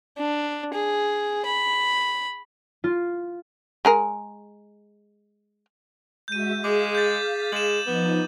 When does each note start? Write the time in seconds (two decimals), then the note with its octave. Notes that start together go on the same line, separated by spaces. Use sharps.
0.17 D4
0.74 G#4
1.46 B5
2.84 F4
3.85 G#3 G#4 A#4
6.28 G#3 F#4 E5 G6 D#7
6.64 G#3 G#4 F5 D6 B6
6.95 G6 A6
7.52 G#3 E7 F#7
7.87 F3 B3 D#4